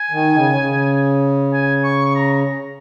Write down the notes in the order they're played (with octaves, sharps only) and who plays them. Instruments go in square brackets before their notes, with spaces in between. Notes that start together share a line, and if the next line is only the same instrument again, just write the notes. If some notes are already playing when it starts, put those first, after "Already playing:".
Already playing: [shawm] G#5
[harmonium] D#3
C#3
C#3
[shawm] G#5
C#6
C#6
A#5